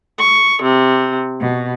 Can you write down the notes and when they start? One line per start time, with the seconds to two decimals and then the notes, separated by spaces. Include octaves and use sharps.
0.18 C#6
0.62 C3
1.40 B2